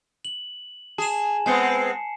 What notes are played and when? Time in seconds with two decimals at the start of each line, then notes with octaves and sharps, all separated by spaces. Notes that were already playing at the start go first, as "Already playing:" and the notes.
0.25 F#7
0.98 G#4 A5 E7
1.46 G#3 B3 C4 G#5 C7 C#7